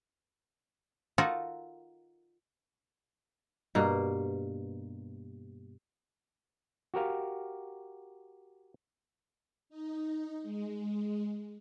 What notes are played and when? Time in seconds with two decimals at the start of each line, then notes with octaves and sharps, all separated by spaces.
1.18 D#4 F4 F#4 A4 A#4
3.75 G2 B2 A#3
6.94 F#4 G4 A#4 F5
9.70 D#4
10.42 G#3